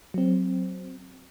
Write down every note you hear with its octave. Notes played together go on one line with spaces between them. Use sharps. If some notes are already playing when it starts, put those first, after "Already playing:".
F#3 C4